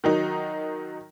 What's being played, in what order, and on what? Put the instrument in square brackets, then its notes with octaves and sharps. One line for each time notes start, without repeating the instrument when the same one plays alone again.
[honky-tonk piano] D#3 F#3 D#4